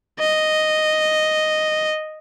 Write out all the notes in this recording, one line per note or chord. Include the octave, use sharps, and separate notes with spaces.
D#5